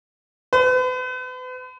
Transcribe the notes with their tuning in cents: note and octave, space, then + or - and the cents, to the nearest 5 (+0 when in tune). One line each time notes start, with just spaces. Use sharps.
B4 +40